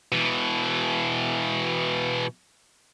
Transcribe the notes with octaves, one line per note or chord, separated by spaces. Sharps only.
B2 E3